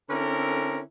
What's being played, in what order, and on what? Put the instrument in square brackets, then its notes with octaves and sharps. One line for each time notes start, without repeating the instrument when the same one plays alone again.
[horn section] D3 C4 C#4 E4 A4 A#4